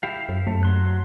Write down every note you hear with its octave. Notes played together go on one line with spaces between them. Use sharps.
E4 G4 F5
F#2
F#2 A3
F#3 C6 F#6